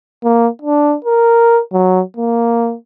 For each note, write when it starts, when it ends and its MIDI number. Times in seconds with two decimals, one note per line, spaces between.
0.24 0.48 58
0.62 0.95 62
1.04 1.60 70
1.73 2.01 54
2.17 2.75 58